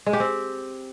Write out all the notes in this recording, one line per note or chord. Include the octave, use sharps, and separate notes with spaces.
G#3
G4
C4